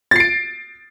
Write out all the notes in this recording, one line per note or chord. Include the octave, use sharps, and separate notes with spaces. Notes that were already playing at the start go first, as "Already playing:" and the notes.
A6 C7 D7